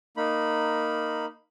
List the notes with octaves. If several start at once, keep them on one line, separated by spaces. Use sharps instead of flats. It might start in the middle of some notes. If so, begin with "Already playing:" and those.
A#3 D#4 B5